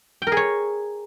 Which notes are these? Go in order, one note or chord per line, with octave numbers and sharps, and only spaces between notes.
G5
A#4
G#4
C#5